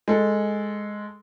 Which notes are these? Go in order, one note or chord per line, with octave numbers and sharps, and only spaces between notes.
G#3 A4